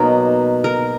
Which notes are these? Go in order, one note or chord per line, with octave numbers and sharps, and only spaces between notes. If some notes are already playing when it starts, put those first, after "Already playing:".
Already playing: B2 F#3 A#3 D#4 A#4
A#4